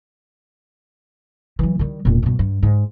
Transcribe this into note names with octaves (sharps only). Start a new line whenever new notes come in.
E3 F#3
D#3 G3
E1 A#2
G2 B2
G2
G#2